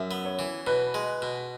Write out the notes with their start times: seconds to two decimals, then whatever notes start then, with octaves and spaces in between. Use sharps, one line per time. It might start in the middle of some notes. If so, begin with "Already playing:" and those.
Already playing: F#2 E5
0.11 B3
0.25 C#5
0.39 E3
0.67 B2 B4
0.94 G#3
1.22 B2